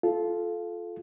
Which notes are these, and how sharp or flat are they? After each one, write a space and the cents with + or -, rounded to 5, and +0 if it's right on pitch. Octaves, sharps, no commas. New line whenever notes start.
F4 +0 A4 -20